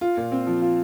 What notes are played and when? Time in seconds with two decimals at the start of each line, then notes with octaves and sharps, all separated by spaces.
0.01 F4
0.17 A#2
0.32 C4
0.47 F3
0.62 F4